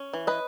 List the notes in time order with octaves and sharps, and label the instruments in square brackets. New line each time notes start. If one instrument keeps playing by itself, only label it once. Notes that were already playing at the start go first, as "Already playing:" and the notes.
Already playing: [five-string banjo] C#4
E3
B4 D#5